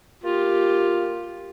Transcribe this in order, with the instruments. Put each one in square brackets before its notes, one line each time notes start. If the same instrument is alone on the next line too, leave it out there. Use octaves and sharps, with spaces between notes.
[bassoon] A#3 [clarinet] F4 [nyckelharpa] G4